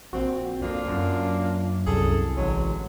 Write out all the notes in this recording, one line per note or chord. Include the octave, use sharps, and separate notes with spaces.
A#1 C4 F#4
F2 A#3 D4 F4
F#2
C2 F#3 G#4 A4
A1 D3 F#3 G#3